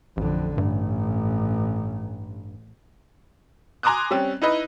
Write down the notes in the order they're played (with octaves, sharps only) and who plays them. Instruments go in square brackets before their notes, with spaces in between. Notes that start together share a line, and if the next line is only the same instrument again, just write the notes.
[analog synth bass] A1 [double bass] F2 D3
[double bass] A1 [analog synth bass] G2
[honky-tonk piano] G#5 A#5 C6 D6 D#6 F#6
G3 C4 C#4
D#4 E4 B4 D#5